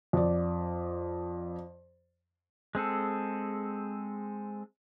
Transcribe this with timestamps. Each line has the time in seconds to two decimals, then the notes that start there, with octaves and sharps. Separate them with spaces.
0.13 F2 D5
2.75 G#3 C4 G#4 A4